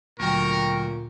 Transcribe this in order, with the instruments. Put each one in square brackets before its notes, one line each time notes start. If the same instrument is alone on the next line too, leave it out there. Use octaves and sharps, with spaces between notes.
[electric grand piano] D2 F#3 G5 [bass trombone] A#2 [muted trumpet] A#4 [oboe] C#6